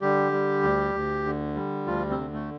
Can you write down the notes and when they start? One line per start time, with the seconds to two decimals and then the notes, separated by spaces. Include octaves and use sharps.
0.01 D3 G3 G4
0.32 G3
0.63 D2
0.95 D2
1.25 D3
1.55 G3
1.86 D2 F3 F4
2.10 C3 C4
2.17 D3
2.34 A3